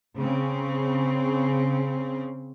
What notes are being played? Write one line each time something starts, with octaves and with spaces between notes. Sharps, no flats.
C#3 C4